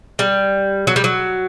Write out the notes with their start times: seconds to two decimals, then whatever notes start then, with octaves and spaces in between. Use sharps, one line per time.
0.19 G3
0.87 F#3
0.96 G3
1.04 F#3